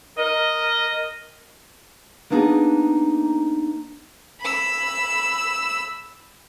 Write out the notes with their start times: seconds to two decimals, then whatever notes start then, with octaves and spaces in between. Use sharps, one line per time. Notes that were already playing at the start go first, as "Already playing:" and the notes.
0.18 A#4 D#5
2.30 A#3 B3 D4 D#4 G#4
4.41 B5 E6